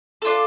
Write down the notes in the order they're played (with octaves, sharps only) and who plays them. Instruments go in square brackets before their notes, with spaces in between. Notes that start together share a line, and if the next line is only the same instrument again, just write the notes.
[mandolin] D4 F4 A4